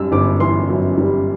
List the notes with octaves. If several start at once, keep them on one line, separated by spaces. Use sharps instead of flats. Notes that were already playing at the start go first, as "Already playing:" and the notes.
Already playing: F#2 G3 E6
G1 D6
E3 C6
F#2
G3